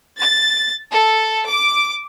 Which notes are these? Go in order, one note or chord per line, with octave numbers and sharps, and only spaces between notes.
A6
A4
D6